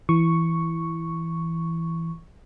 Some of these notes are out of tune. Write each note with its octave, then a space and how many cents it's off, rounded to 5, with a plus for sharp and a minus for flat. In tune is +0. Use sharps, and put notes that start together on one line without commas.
E3 +5 C#6 +0